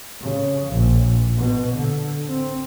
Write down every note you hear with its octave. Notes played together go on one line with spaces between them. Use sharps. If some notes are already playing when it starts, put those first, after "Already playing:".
C#3
A#1
B2
D3
C4